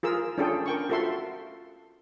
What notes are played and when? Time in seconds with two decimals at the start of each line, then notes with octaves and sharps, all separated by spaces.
0.03 F4 G#4 A#4 E6
0.38 C#4 D4 F4 G#4 A4 G5
0.66 A#4 G5 C#6
0.89 F4 F#4 A4 E5 C6